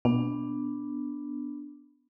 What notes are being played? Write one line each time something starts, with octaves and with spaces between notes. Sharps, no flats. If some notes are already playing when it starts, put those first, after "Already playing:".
B2 B3 D4